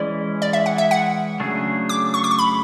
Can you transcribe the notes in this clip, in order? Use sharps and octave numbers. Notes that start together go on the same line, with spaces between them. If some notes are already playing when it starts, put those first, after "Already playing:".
Already playing: E3 G#3 C#4 E4 D5
D5
E5
F#5
E5
F#5
C#3 F#3 A3 D4 G#4
D6
C#6
D6
C#6
B5